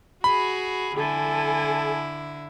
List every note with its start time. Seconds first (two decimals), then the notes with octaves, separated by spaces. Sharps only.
0.24 F#4 G#4 B5
0.97 D3 E4 A4 G#5